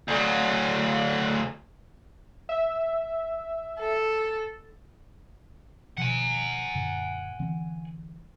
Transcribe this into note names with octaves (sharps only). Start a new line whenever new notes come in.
D2 F#3
E5
A4
B2 D#3 F3 F#5 G#5
F#2 A#2 D3
D3 E3 C4